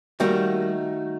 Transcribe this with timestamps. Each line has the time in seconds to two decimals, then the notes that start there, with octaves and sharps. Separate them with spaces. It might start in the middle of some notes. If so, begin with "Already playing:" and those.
0.20 D#3 G3 A3 A#3 D#4 F#4